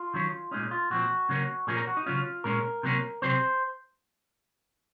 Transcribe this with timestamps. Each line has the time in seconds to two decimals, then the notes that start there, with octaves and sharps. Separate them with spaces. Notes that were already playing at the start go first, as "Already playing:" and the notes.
Already playing: F4
0.14 D#3 F#3 C#4
0.51 A#2 G#3 C#4 D#4
0.71 F4
0.90 A#2 F3 C4 F#4
1.29 C#3 F#3 A#3 C#4
1.67 A#2 F3 A#3 C#4 G#4
1.77 A#4
1.87 F#4
1.97 D#4
2.06 C#3 F#3 C#4 F4
2.44 A#2 G#3 C#4 A#4
2.83 C3 F#3 A#3 C#4
3.22 C3 F#3 C4 C5